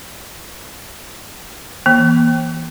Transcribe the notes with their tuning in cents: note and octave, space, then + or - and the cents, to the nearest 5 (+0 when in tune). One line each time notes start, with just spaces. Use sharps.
E3 +0 A#3 +35